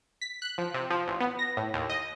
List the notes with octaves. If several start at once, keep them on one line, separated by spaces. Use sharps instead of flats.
B6
F#6
F3
C3
F3
A1
B3
A#6
A2
D#2
D#5